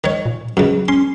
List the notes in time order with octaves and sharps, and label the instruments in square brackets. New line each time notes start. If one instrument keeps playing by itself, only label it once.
[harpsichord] D#3 C#5
[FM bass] A#2
[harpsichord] C#2 F#2 [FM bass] F#3
[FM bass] C#4 [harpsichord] C6